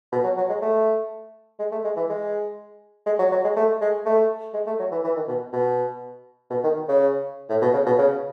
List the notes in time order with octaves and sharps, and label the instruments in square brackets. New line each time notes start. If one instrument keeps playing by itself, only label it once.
[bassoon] B2
F#3
F#3
G#3
A3
G#3
A3
G#3
E3
G#3
G#3
F#3
F#3
G#3
A3
G#3
A3
G#3
A3
F#3
E3
E3
D#3
B2
B2
B2
D#3
C#3
A2
B2
C#3
B2
C#3